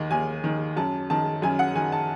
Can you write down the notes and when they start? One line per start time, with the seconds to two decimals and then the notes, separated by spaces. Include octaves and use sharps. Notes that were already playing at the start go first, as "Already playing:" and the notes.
Already playing: D#2 D#3
0.11 D#2 G#5
0.44 D#3
0.77 F#2 A5
1.10 D#3 A5
1.42 F#2 G#5
1.59 F#5
1.75 D#3 G#5
1.92 A5